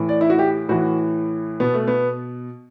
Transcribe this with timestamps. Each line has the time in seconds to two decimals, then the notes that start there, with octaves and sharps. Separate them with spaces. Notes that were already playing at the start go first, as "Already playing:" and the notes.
Already playing: A2 E3
0.09 D5
0.21 E4
0.30 F#4
0.39 G4
0.69 A2 E3 F#4
1.60 B2 B3
1.74 A3
1.88 B3